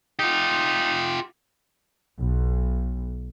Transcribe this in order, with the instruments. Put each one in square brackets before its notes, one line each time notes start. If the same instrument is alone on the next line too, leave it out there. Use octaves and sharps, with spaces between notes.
[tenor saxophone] D#4 [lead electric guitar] F4 G4
[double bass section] B1